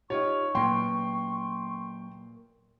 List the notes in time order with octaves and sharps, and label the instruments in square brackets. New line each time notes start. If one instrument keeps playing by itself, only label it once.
[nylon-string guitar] D#4 F4 G4 [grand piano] C#5 [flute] C#6
[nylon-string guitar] A#2 B3 [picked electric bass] F#3 A#3 [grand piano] G5 C6